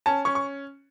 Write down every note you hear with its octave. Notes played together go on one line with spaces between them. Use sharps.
C#4 A5
C#4 C#6
C#6